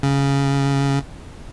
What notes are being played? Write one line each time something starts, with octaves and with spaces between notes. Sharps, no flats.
C#3